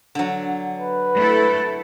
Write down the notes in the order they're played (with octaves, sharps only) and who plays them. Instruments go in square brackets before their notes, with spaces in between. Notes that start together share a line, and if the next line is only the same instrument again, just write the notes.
[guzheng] D3 F#3
[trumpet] B4
[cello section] A3 E4 A4